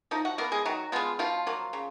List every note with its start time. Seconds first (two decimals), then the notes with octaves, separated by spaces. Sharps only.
0.11 F3 D#4 D#5
0.25 F#4 F#5
0.38 A#3 B3 A#4
0.52 G#3 G#4
0.65 D#3 F#3 F#4
0.92 F3 G#3 B3 F4
1.19 B2 F3 F4
1.47 F#3 A#3
1.73 C#3